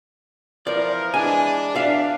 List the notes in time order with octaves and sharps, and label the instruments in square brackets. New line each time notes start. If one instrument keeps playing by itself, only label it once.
[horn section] E3 F3 A#4 [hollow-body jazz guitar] D5
[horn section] E3 G#3 D4 [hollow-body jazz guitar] G#5
[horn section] B2 D4 [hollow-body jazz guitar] D5 E5 F5